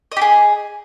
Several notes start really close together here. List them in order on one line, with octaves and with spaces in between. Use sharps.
D#5 G4 G#4